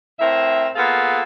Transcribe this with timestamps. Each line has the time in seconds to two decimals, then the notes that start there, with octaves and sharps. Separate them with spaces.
0.19 A2 C4 A#4 E5
0.75 A#3 B3 F4 G#4 A4 F5